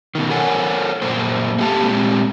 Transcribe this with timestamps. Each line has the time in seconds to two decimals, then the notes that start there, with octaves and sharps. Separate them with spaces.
0.15 B2 D#3
0.30 A4 A#4 C#5 F#5 G#5
1.02 F#2 A#2 A#3 C5
1.58 A3 A#3 G4 F#5 A5
1.82 A#2 G#3 C4 G4